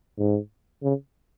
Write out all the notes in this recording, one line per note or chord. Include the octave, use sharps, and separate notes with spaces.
G#2
C#3